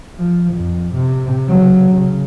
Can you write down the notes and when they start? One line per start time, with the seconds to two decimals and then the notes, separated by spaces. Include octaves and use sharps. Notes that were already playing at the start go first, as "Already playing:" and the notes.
0.18 F3
0.54 F2
0.95 C3
1.49 C#3 F#3
1.90 C#3